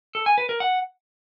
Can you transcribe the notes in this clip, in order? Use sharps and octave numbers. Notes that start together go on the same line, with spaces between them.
A4
G#5
B4
A#4
F#5